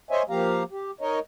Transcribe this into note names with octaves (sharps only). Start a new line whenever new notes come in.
C5 C#5 D#5 E5 G#5
F3 A#3 G4 F5 A#5
G4
D#4 A#4 C#5 D#5